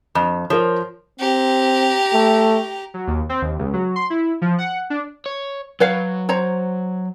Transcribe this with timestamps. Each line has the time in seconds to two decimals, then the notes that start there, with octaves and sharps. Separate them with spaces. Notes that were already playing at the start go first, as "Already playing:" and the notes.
0.15 F2
0.50 F3 A#4 C5 C#5
1.20 C4 G4 A#5
2.13 A3
2.94 F#3
3.07 D#2
3.29 C4
3.42 D#2
3.59 C#2
3.73 F#3
3.96 C6
4.10 E4
4.42 F3
4.58 F#5
4.90 D4
5.26 C#5
5.80 F#3 B4 C#5 F5
6.29 C5 C#5 A#5